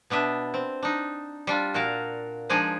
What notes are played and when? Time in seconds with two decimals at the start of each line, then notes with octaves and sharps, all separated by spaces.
0.10 B2 B3 D4 E5
0.54 C4
0.83 D4 D#4
1.47 G3 D4 F4
1.74 A#2 F#4 A#4 F5
2.49 F3 G#3 D4 D#4 G#4 D5